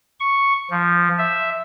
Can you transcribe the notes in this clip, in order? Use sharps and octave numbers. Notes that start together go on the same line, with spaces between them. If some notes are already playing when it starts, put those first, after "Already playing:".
C#6
F3
E5